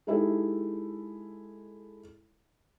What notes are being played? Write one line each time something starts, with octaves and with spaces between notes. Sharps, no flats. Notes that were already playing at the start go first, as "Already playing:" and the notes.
G#3 D#4 E4 G4 A4